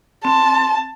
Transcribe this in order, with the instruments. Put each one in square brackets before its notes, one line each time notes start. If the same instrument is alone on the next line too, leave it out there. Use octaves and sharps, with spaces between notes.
[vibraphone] C4 [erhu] A5